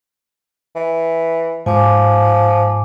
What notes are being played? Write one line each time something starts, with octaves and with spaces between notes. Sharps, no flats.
E3
G#2 F3 G#5 D6